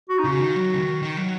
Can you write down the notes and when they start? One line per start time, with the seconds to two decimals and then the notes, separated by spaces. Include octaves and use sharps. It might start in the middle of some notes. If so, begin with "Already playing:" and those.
0.09 F#4
0.19 D#4
0.24 C#3 F#4
0.39 D#3
0.56 F#3
0.74 C#3
0.78 D#3
1.02 D#3
1.17 F#3